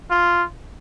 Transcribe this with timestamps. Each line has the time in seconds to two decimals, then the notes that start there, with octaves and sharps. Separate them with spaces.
0.10 F4